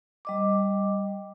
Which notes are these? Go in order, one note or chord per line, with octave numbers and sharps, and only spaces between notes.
G3 D#5 D6